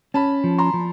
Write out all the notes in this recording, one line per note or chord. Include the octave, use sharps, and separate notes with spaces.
C#4 A5 B5
F3
A#5 C6
F3